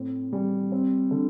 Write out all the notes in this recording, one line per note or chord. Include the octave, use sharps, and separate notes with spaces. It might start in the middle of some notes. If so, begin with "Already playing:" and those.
Already playing: A2 C4
G3
C4
D3